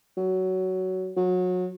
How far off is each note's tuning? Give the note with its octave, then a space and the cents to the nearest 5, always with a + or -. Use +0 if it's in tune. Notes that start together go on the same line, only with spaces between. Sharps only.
F#3 +15
F#3 -25